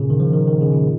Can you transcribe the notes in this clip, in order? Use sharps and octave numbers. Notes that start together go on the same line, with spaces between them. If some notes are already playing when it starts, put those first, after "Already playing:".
Already playing: A#2 C#3
D#3
F3
D#3
D#3
C#3
A#2